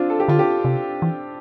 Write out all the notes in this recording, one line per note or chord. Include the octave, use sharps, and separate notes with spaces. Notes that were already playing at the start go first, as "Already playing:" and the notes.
Already playing: C4 D4 F4
A4
G4
D3 F4
G4
C3
E3